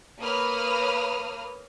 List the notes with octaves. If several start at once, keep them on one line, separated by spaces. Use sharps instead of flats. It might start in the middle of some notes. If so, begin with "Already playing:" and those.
A#3 B4 C#5 D#6 F6